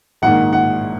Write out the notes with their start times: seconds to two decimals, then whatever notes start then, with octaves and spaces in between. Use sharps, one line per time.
0.22 A#1 G#2 D#3 A#3 F#5
0.53 F#5